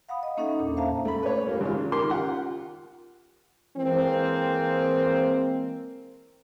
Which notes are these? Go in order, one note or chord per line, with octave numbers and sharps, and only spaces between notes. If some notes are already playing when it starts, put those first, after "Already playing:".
F5 F#5 B5 D#6
D#5
A#3 C#4 D#4 A4 E5 F#5
E2 A#2 D4
C5 E5 F5 A5 A#5
A3 B5
B4 C#5
A#2 G3 A#3 F4
G#1 G#2 F4
D#3 G4 A#4 C6
F4 G4 F#5
E3 G#3 A#3 C4